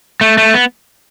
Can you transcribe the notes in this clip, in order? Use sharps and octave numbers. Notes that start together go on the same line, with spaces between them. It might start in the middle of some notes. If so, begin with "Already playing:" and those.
A3
A3
B3